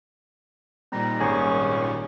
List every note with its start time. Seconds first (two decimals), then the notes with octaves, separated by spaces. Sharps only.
0.92 A#2 D#3 G3 C4 A#5 A#6
1.20 G#1 C#4 G#4 G#5